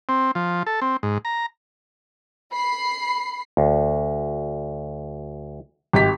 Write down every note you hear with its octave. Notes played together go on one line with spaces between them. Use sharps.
C4
F3
A4
C4
G#2
A#5
B5 C7
D2
G#1 G4 B6